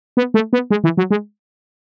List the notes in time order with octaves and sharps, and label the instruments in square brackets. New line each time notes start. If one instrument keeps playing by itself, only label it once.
[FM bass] B3
A3
B3
G#3
E3
F#3
G#3